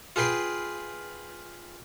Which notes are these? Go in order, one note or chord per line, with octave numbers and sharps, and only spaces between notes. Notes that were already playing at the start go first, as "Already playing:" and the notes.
F4 G#4 B4 G5 C6